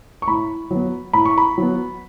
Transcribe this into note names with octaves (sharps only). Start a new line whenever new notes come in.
C#6
A2 B5
F#3 B3
A2 B5
C#6
B5
F#3 B3